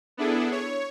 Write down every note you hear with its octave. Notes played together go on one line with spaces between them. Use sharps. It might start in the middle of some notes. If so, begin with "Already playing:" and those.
B3 D4 E4 G#4 A4
C#5